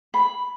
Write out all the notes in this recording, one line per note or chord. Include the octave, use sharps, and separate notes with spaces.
B5